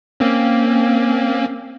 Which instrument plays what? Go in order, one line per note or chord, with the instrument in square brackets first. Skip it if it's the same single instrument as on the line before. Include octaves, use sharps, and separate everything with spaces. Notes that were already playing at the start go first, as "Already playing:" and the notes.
[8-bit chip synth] A#3 C4 C#4